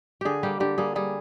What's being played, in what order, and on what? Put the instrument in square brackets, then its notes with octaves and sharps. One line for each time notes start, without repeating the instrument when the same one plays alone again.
[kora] D3 G4 G#4
G3 A#3 G4
D3 G4
G3 A#3 G#4
G3 G#4